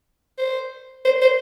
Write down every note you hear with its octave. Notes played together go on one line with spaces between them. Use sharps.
C5
C5
C5